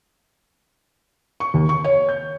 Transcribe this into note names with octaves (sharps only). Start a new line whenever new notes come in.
C#6
D#2
C#6
C#5
G6